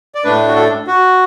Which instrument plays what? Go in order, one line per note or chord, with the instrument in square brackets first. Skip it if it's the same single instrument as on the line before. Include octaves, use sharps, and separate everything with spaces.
[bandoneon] D5
A2 A3 D4 B4
F#4
A4
F#4